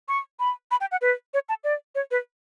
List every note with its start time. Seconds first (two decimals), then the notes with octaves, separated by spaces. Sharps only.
0.08 C#6
0.40 B5
0.71 B5
0.81 G5
0.91 F#5
1.01 B4
1.34 C#5
1.49 A5
1.64 D5
1.95 C#5
2.11 B4